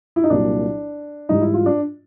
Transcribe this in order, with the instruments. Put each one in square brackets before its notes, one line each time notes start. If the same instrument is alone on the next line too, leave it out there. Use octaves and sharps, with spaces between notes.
[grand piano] E4
D#4
C2 A#2 F#3 D4
G#2 E3 G3 D#4
E4
F4
D4